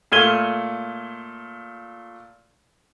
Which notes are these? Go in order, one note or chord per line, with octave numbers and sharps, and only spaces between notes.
A#2 A3 F6 G#6 D#7 G7